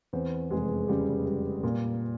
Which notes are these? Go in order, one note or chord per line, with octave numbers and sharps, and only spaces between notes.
E2 C4 C5
F1 G#3 G#4
C#3 G3 G4
G3
A#2